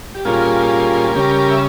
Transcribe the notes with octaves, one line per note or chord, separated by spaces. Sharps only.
G4
A#2 G3 A#3 C#4 F4 G#4
C#3 G3 C#4 G4 A#4
E5